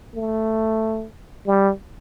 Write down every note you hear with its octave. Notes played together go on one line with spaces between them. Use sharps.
A3
G3